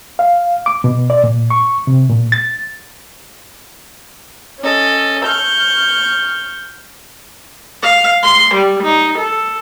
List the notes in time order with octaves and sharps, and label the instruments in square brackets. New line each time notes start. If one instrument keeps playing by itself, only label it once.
[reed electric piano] F5
D6
B2
D5
A#2
C#6
C3
A#2
A6
[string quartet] C#4 A4 D#5
C#6 F6 G6
[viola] F5
C6
G3
D#4
A4